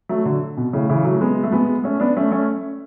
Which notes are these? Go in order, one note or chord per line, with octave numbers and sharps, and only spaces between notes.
F#3 A3
D3 F#3
B2
A2 C#3
C#3 E3
F#3 A3
G#3 B3
A3
G#3 B3
A3 C#4
B3 D4
A3 C#4
A3 C#4